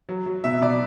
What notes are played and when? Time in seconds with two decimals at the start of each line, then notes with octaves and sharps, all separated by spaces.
0.09 F#3
0.26 F#3
0.44 B2 E5
0.62 B2 D5